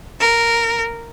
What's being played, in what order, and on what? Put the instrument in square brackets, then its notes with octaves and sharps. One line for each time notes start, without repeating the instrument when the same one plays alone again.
[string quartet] A#4